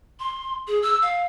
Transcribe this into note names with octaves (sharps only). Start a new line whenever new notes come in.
C6
G#4
E6
F5